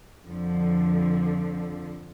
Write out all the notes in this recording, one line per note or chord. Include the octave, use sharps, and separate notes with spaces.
F2 D3 F3